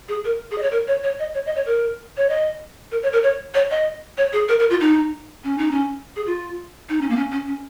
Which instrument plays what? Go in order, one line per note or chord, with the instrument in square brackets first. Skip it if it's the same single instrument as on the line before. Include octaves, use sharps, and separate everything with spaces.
[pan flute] G#4
A#4
G#4
D#5
C#5
A#4
C#5
C#5
D#5
C#5
D#5
C#5
A#4
C#5
D#5
A#4
C#5
A#4
C#5
C#5
D#5
C#5
G#4
A#4
A#4
F4
D#4
C#4
D#4
C#4
G#4
F4
D#4
C#4
A#3
C#4
C#4
C#4